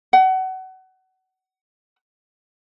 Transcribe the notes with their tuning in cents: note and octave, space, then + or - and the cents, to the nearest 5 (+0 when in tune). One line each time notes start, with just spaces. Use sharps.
F#5 +25